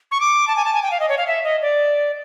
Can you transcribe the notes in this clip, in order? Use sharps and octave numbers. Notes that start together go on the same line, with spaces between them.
C#6
D6
A5
G#5
A5
G#5
G5
F5
D#5
C#5
F5
E5
D#5
D5